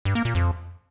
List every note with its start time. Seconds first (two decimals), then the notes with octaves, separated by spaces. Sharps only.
0.05 G2
0.15 A#3
0.25 A#2
0.35 F2